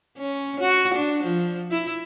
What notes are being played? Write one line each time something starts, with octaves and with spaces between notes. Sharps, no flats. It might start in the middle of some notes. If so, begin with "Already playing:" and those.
C#4
F#4
D4
F3
E4